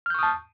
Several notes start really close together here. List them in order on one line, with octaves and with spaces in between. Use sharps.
F6 G6 C#6 D#6 A5